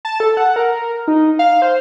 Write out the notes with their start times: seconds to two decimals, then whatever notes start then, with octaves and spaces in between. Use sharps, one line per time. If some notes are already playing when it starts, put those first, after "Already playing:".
0.05 A5
0.20 A4
0.37 F#5
0.56 A#4
1.08 D#4
1.39 F5
1.62 C5